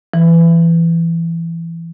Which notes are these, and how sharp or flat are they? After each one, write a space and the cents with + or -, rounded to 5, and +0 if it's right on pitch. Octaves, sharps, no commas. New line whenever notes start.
E3 +20